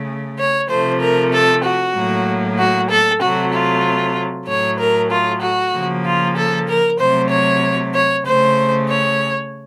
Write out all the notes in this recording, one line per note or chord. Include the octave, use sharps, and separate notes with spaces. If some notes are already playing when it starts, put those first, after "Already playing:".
Already playing: C#3 A3
C#5
C3 F3 A3 C5
A#4
A4
F#4
A2 F#3 A#3
F#4
A4
C3 F#3 A3 F#4
F4
A2 F#3 A3 C#5
A#4
F4
F#4
C#3 F3 A#3
F4
A4
A#4
C3 F#3 A3 C5
C#5
C#5
C#3 A3 C5
C#5